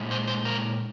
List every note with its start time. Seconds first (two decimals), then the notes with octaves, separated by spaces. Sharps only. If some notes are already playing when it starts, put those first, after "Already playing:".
Already playing: A#2 G#3
0.11 C5
0.28 C5
0.45 A#4